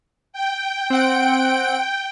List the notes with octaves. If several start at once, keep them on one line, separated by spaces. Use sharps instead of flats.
G5
C4 F#5 D7